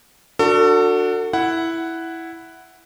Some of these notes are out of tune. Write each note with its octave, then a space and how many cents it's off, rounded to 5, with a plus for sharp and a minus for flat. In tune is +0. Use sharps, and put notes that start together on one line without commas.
D4 +5 F#4 -10 A4 +35
E4 +0 F#5 +5